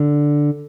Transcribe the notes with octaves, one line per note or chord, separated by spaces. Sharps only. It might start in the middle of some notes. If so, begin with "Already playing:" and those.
Already playing: D3